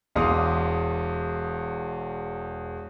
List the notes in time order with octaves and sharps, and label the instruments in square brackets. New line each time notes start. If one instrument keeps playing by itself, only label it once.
[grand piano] E1 E2 F5 C6 D6 D#6